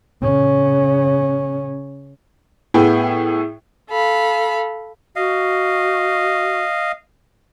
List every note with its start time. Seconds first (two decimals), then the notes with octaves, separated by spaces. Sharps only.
0.23 C#3 C#4
2.74 A2 B3 E4 G#4 G5
3.89 A4 F5 B5
5.16 F#4 D#5 F5